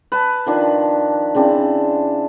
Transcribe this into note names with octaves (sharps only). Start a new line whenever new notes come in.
B4 A5
D#3 F3 D4
C#3 C4 D4 E4